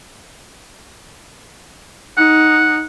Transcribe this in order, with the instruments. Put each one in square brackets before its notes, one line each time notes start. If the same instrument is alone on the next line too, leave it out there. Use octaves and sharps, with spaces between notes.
[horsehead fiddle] D#4 [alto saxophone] F#5